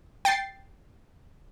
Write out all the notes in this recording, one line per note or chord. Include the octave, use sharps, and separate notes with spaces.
G5 A6 C7